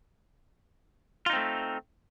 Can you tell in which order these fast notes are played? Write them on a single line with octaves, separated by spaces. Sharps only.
F4 D#4 C4 A3